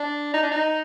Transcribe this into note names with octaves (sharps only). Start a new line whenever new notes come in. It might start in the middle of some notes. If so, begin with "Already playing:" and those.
Already playing: D4
D#4
D4
D#4